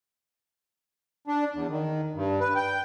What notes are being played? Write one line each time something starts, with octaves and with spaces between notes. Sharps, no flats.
D4
E2
D#3
G2
B4
G5